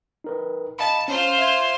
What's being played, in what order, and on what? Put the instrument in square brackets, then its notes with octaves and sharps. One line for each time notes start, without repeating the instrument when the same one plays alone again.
[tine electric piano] D#4 A#4 B4
[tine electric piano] D#5 F5 B5 [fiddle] A5
[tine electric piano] C#4 [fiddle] F4 C5
[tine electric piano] E5 G#6